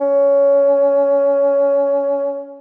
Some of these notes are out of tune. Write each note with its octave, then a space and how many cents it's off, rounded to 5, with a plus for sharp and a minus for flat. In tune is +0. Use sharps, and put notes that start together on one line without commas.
C#4 +15